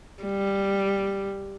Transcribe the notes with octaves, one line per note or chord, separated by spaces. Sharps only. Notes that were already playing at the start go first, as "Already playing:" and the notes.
G3